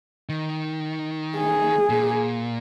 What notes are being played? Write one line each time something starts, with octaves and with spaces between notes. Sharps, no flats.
D#3
G#4
A#2